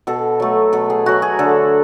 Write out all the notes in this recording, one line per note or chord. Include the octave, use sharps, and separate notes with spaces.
B2 A4
F#3 A3
B2 A4
G#4
F#3 A3 F#4
G#4
D3 A4